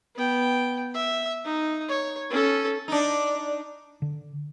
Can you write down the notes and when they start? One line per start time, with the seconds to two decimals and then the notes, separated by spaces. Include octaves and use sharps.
0.15 B3 G5
0.94 E5
1.45 D#4
1.88 C#5
2.30 C#4 A4
2.88 D4 D#4
4.02 D3